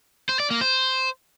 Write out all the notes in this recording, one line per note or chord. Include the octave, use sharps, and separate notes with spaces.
C5
D5
A#3
C5